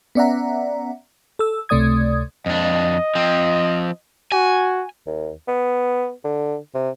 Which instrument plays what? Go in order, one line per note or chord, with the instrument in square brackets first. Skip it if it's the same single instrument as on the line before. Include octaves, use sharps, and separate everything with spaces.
[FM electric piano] B3 C#4 D5 E5 F#5 A#5
A4 E6
C#2 C3 A3 D5 D#6 G#6
[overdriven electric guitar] F2 D4 [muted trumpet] D#5
[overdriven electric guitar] F3 C4
[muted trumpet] F#4 [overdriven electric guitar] G#5
[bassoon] D#2
B3
D3
C3